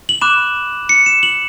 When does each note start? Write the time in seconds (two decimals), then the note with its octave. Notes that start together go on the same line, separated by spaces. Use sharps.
0.09 F#7
0.21 B5 D6 F#6 E7
0.89 C#7
1.06 E7
1.23 F#7